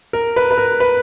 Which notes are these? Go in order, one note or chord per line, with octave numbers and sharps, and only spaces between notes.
A#4
B4
B4
A#4
B4